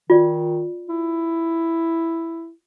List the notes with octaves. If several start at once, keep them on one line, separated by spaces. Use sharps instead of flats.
D#3 F4 D5
E4